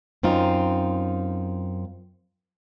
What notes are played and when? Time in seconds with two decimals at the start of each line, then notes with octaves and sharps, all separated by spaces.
0.23 F#2 C4 D#4 F4